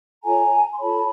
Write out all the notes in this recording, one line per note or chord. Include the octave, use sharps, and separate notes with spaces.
F4 A4 C#5 G#5 A#5
C6
F4 A4 C#5 A5 B5